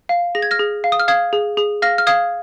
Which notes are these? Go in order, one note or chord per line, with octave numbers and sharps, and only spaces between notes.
F5
G#4 A#6
G#6
F6 A#6
G#4
F5
D#6
F6
F5 D#6 G#6
G#4
G#4
F5 F6 A#6
F6
F5 D#6 G#6